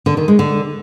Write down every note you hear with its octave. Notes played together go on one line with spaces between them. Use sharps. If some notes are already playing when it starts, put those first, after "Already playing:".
D3
D#3
G#3
D3